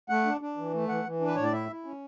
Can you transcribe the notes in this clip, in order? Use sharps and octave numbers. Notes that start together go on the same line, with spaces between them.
A3 F#5
D4
D4
E3
A3
E3 F#5
E3
D4
B4
A2 C#5
D5
E4 E5
E4
C#4